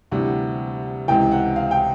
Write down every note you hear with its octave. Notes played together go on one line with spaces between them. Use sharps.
D2 C3 E3 G3 F#5
C#2 C3 E3 G5
F#5
F5
G5